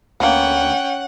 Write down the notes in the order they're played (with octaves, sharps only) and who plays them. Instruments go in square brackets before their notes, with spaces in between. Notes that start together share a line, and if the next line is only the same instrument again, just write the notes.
[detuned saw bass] D2 [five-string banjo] A#3 B3 [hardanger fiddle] C#4 G5 [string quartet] F#5